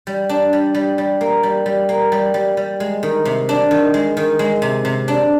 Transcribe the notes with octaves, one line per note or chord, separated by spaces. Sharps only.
G3
D4
G3
G3
G3
A#3
G3
G3
A#3
G3
G3
G3
G#3
D#3
C3
D4
D#3
G#3
D#3
G#3
C3
C3
D4